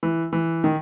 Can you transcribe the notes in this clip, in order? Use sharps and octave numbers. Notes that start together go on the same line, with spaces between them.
E3
E3
D#3